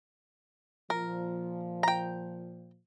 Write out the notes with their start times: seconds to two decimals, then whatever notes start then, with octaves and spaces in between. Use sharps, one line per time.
0.90 A#2 F3 A#4
1.83 G5 A#5